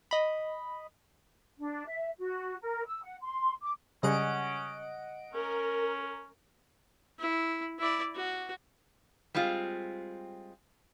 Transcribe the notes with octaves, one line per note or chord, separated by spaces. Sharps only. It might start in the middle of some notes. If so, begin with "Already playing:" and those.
D#5 B5
D4
E5
F#4
A#4
E6
F#5
C6
D6
C#3 G3 C#4 G#4 D#5 F#5 D7
C#4 A#4
E4
E4 D5
F#4
G3 G#3 C4 F4